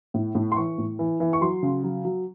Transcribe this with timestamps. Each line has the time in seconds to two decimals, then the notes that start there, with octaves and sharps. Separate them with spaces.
0.14 A2
0.35 A2
0.52 C6
0.56 E3 C#6
0.78 A2
0.99 E3
1.20 E3
1.33 C#6
1.41 F#3 C6
1.63 C#3
1.84 F#3
2.05 F#3